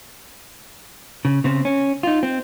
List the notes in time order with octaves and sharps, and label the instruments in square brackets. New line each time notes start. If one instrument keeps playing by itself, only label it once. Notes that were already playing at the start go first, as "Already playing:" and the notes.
[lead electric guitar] C#3
C#3 C4
C#4
D#4 F4
C4